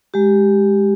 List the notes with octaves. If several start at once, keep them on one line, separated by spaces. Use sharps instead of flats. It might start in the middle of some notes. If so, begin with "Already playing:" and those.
G#3 G4